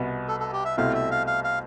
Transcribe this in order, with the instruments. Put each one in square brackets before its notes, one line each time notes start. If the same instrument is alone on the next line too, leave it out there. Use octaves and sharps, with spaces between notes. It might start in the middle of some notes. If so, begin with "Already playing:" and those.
Already playing: [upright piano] C2 B2 B3
[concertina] A4
A4
G4
E5
[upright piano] C2 B2 A3 C4 E4 [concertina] F5
[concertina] E5
F5
F5
F5